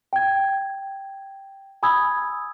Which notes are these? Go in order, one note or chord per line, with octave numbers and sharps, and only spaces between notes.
G5 G#6
G#5 B5 D#6 E6 G#6